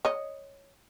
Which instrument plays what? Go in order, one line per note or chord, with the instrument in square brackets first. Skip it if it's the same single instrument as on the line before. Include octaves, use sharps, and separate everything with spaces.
[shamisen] C#5 D#5